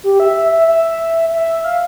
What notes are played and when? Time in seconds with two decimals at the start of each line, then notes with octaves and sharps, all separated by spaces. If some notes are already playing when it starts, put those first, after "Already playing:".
0.04 G4
0.20 E5
0.36 E5
0.52 E5
0.68 E5
1.32 E5
1.64 F5